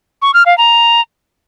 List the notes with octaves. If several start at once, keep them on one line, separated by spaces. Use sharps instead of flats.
C#6
F6
F5
A#5